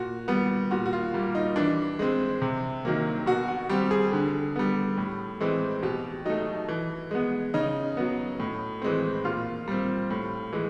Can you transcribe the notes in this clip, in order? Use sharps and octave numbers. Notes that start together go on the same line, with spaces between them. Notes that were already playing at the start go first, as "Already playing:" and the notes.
Already playing: A#2 F#4
G3 B3
A#2 F#4
F#4
F4
G3 A#3
D#4
E3 D4
G#3 C4
C3
D#3 F#3 A#3
B2 F#4
F#4
G3 C4 G4
G#4
D3 G#4
G3 B3
A2
E3 G#3 C4
B2 G4
F#3 A3 D#4
E3
G#3 B3
C#3 D#4
F#3 B3
A2
E3 G#3 C4
A#2 F4
G3 C4
A2
E3 G#3